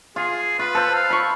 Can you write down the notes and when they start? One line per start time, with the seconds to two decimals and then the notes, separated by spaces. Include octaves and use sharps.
0.16 F4 G#4
0.59 F4 B4
0.75 A4 C5
0.94 F5
1.10 B5 C#6